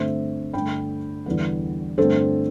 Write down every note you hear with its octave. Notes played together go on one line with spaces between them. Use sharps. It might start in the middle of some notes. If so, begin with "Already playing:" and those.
Already playing: G2 D3 A3 C4 C5 E5
G2 D3 A3 G5 B5
E2 D3 G3 B3
G2 D3 A3 C4 A4 C5